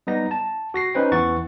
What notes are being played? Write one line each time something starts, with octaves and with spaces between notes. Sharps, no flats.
G3 B3 D#4 A#6
A5
F#4 A#6 C7
C#4 D#4 B4 C5 G5
E2 E3 F#5 C#6 A6